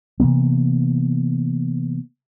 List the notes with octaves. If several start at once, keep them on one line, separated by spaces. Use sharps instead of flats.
C3 E3 A#3 B3